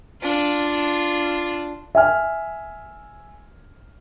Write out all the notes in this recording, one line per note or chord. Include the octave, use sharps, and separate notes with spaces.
D4 F4
E5 G#5 F6